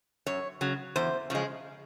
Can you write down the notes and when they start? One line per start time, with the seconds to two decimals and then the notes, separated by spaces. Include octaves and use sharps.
0.26 F#2 C#5
0.61 C#3 F#3
0.96 E2 C5
1.30 C#3 F3 G#3